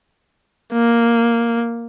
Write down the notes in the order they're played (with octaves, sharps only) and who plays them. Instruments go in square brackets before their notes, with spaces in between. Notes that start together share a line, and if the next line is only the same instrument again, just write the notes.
[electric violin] A#3